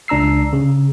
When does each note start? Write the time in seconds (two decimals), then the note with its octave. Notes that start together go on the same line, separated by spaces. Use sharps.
0.08 C#2 D4 A#5 E6 C7
0.53 C#3